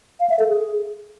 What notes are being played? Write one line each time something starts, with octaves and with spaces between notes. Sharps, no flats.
F5
E5
A4
G#4